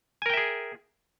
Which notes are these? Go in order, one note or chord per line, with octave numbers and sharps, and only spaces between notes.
G#4 A#4 E5 G5 G#5